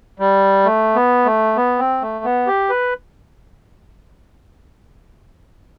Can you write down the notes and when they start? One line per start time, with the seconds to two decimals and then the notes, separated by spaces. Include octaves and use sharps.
0.20 G3
0.65 A3
0.96 B3
1.25 A3
1.56 B3
1.79 C4
2.02 A3
2.25 B3
2.47 G4
2.70 B4